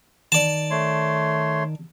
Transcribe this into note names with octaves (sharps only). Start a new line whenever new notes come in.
D#3 D5 A5
A3 C#5 C6